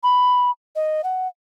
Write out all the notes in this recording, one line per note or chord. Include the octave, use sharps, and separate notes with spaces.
B5
D#5
F#5